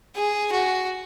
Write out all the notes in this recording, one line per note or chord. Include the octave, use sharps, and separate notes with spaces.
G#4
F#4